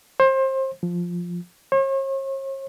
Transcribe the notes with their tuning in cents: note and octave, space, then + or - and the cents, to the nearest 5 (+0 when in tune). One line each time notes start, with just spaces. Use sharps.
C5 +30
F3 +5
C#5 -45